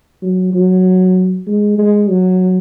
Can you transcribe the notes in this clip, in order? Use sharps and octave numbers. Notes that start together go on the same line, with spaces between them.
F#3
F#3
G#3
G#3
F#3